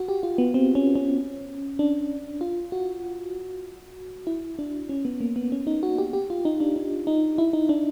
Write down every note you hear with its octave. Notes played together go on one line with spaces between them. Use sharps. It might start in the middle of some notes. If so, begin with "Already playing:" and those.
Already playing: F#4
G4
F4
B3
C4
C#4
C#4
D4
F4
F#4
E4
D4
C#4
B3
A#3
B3
C#4
D#4
F#4
G4
G4
F4
D#4
D4
D4
D#4
E4
D#4
D4